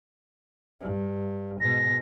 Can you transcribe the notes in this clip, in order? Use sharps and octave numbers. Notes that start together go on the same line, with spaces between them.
G2
G#2 B2 A#6